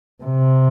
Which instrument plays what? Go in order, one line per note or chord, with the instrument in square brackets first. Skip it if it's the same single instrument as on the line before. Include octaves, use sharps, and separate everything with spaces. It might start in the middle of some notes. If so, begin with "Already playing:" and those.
[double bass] C3